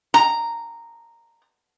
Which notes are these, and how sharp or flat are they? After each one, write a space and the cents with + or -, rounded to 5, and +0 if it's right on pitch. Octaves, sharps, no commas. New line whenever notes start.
A#5 -10